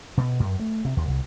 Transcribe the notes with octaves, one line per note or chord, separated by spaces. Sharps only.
B2
F#2
A3
C3
D#2
C2